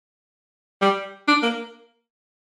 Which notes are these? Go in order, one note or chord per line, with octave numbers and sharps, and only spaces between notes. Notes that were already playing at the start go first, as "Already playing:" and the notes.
G3
D4
A#3